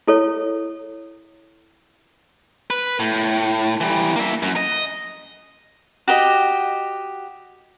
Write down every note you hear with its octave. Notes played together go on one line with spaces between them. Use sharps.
E4 A4 C#5
B4
A2
E3 G3
A#3 E5
F#2
D#5
F#4 G4 D#5